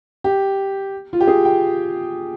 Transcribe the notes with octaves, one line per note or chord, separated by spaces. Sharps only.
G4
F4
G4
G#4
G5